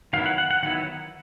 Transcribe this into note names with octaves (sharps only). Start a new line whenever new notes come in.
D#3 F#3 B3 E4 F5
F#5
F#5
F#5
D#3 F#3 B3 E4 F#5